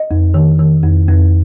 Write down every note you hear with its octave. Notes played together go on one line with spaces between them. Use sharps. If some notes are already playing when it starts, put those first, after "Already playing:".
Already playing: D#5
F2
D#3
D#3
F2
F2